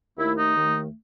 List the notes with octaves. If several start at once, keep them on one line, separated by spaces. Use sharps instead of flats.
D#2 D#3 A3 E4
D#4
D#2 D#3 A3